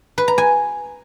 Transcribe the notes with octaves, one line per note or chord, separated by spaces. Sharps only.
B4
A#5
G#5